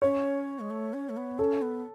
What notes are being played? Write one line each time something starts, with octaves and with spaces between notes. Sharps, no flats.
C#4 C#5
G#3
A3
C#4
A3
B3
C#4 A4
B3